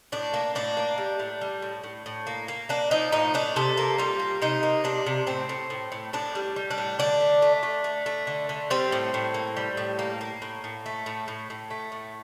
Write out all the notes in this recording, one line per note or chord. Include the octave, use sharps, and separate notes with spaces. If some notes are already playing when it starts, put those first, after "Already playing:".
A2 D4
A#3
A2 D4
A#3
G3
A2
G3
A2
A2
A2
A#3
A#3
A#3 D4
F3 D#4
A2 D#4
A2 D4
C3 A4
A#3
G3 F4
A#3
C3 D#4
A#3
C3 D4
C3
A2 C4
A2
A2
A2
A2 D4
G3
G3
D4
A2
D3 D4
A3
A3
A3
A3
A3
D3
D3
G3 C4
A2
A2
A#3
G3
A2
A#3
A#3
A2
A2
A3
A2
A2
A2
A3
A2